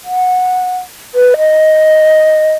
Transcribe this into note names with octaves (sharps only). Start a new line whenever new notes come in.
F#5
B4
D#5